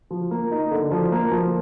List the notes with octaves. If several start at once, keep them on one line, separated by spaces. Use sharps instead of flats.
F3
A#3
D#4
D3
F3
A#3
F3